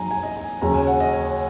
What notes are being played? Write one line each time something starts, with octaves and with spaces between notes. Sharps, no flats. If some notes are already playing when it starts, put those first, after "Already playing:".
Already playing: F#2 F#3 D#4 G#5 A#5
G#5
D#5
G#5
D#2 C#3 F#3 C#4 A#5
G#5
F#5
D#5
C#5